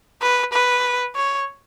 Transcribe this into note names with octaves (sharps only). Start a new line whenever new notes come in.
B4
B4
C#5